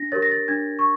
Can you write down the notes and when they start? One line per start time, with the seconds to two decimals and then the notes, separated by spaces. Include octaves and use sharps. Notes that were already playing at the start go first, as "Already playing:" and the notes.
Already playing: D4 A#6
0.12 G4 A#4 C#5 A6
0.22 A#6
0.32 A6
0.48 D4 G#6
0.79 C#6